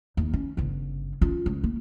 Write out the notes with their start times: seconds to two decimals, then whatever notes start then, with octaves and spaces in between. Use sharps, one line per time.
0.17 D#2
0.33 C#4
0.57 G1 C#3
1.21 C#4 F4
1.46 C#2
1.64 A#3